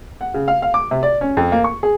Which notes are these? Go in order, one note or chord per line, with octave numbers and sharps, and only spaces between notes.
F#5
C#3
F5
F5
D6
C3
D5
C#4
F2
A#3
C#6
G#4